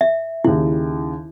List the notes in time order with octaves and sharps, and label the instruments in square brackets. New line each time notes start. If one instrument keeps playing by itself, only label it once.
[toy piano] E5
[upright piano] D#2 C#3 [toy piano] E4